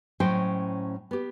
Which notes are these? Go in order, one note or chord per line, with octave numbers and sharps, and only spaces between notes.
A2 F#3 C#4 C5 D#5 G5
B3 G4